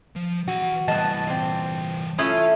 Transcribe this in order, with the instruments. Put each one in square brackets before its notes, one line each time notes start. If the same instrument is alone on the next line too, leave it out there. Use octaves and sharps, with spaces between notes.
[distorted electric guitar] F3
[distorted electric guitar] E3 F#5 [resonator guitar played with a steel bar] F#4
[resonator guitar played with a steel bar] A2 B3 D#5 [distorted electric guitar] E3 G3 [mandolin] A5
[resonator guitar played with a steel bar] A#2 C4
[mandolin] A3 E4 D#6 [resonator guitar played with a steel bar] C#4 [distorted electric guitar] F4